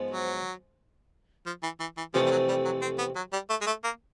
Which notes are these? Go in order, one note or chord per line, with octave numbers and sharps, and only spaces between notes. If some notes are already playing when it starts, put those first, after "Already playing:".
Already playing: G#2 F3 G#3 B3
F#3
F3
E3
E3
E3
F2 C3 E3 F3 A3
G3
F#3
G3
F#3
C4
B3
F#3
G3
A3
G#3
A3
A#3